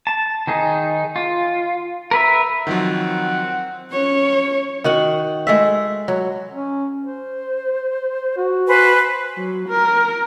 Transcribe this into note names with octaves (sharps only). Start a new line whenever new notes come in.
A5
D#3 D#4 G#4
F4
A#4 B4 E5
D#3 F3 F#3 C4 F#5
C#4 C#5
D#3 F#4 F#5
G#3 A3 E5
F#3
C#4
C5
F#4
B4 C5 G#5
F#3
A#4